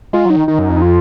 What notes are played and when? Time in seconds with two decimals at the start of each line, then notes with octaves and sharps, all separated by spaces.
0.13 G#3 F4
0.25 F#3 D#4
0.36 D#3
0.48 D#3 D#4
0.59 F#2
0.70 F2
0.76 D#4
0.82 F4